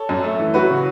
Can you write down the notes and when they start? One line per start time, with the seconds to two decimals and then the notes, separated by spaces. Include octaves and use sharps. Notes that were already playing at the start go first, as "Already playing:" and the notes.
Already playing: A4 C#5
0.09 F#2
0.24 A3
0.39 E3
0.54 F#3 F#4 B4
0.70 C#3